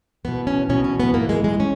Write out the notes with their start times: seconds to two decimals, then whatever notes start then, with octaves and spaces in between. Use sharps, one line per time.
0.25 E2 B2 B3
0.47 C#4
0.69 E2 B2 C#4
0.84 C#4
1.00 B3
1.14 G#2 E3 A#3
1.29 G#3
1.44 G#3
1.60 C#4